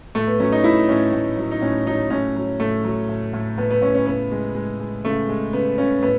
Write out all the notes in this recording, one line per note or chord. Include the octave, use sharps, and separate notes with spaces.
A2 A3
B3
F#3 C#4
D#4
A2 E4
A2 C#4
A2
F#3
D#4
A2 C#4
F#3 D#4
A2 C#4
F#3
A2 A3
F#3
A2
A2
A2 B3
B3
A2 C#4
C#4
C#3 B3
G#3
G#3
G#3
C#3 A3
G#3
C#3 B3
C#3 C#4
A2 B3